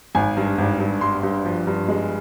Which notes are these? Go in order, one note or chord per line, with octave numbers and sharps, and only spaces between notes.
G#1 G#5
G2
G#1
G2
G2 C6
G2
F3
G2
G#3